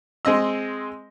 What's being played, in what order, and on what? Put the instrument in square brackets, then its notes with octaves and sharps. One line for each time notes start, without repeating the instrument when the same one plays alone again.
[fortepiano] G#3 C4 D#5 E6